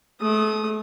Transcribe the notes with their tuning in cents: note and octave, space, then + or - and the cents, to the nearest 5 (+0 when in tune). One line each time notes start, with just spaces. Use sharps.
A3 -35 D#6 +0